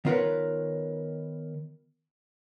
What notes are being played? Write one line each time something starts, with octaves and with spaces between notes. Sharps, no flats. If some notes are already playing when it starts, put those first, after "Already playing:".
D#3 B3 F4 A#4 B4 C#5